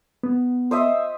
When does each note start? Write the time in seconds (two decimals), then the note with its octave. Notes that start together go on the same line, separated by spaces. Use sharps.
0.23 B3
0.71 C5 D#5 E5